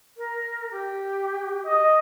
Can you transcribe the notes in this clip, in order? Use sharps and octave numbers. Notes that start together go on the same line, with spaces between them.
A#4
G4
D#5